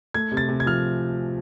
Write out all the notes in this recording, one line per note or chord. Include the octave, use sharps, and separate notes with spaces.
A3 G#6
C3
A6
C3
G#6
F3 F6